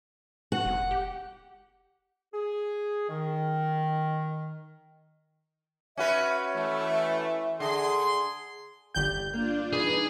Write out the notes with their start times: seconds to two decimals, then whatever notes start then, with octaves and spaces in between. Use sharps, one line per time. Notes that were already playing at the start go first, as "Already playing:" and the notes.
0.52 F#4 F#5
0.65 F1
0.91 G4
2.34 G#4
3.10 D#3
5.97 C#4 F#4 B4 E5
6.55 E3 A3 E5
7.60 D3 G#4 C6
8.95 G1 G4 D5 G5 G6
9.33 A#3 D4 F4 D5
9.73 G2 E3 D4 D#4 G#4 B4